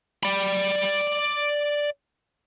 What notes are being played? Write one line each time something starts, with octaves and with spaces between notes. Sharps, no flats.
D5 B5